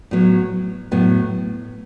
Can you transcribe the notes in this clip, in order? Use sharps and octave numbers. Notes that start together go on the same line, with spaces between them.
A2 F#3 B3
A2 F#3 B3